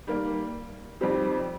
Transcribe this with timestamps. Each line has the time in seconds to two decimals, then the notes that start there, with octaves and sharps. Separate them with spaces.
0.07 D#3 G3 A#3
1.01 F2 D#3 G3 C4 G4